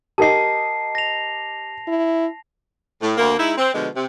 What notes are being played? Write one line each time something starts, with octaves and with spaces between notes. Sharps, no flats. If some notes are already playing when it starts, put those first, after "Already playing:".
G4 A#4 D#5 A5 C7
A#6 F7
E4
A2
D2 A#3
G#3 D#4 E4
C4
B2 D3 F3 G#3
C3